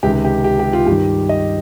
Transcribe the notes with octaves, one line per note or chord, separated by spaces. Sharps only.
C#2 C3 D#3 G4
G4
G4
G4
F4
G2 D#3 G4
D#5